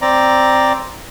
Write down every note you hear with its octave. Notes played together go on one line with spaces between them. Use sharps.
C4 D5 A#5